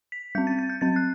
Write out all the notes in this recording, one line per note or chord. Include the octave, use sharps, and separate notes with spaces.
B6
G3 C4 G6
A6
A6
G6
F#3 C4 A6
F#6